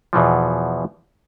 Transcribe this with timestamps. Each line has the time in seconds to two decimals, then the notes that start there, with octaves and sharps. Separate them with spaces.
0.13 E2 B2 E3 F3